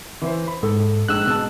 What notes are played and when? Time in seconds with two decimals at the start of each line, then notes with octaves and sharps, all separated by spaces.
0.22 E3 E4 C5
0.47 B5
0.63 G#2 A4
1.08 A#1 G#2 G#3 E6 F#6
1.26 B2 G#3 A5